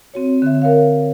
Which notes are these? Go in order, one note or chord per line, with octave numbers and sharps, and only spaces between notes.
C4 F#4 C#5
D3 E5
A#4 C#5 F5